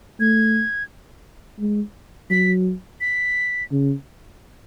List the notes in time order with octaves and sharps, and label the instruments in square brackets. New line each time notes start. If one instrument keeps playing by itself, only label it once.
[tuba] A3 [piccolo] G#6
[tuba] G#3
[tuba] F#3 [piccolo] B6
[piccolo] B6
[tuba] C#3